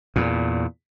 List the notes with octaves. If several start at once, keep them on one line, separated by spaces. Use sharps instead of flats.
E2 A#2